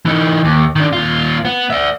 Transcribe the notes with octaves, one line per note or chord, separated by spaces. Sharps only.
E3 D#4
D#2
D#3 D4
D#2 F4
B3
D5 E5